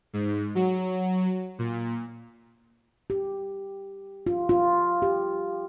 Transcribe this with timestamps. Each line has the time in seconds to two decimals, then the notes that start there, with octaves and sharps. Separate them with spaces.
0.13 G#2
0.55 F#3
1.59 A#2
3.10 G4
4.27 F4
4.49 F4
5.02 G4